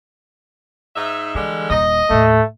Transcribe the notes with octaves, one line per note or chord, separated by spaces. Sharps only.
G#2 D#4 E5
D3 E3 G3 G#3
D#1 D#5
D#2 A2 A3